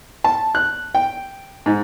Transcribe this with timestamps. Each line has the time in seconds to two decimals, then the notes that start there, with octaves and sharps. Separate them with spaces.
0.24 A5
0.55 F#6
0.95 G5
1.66 G#2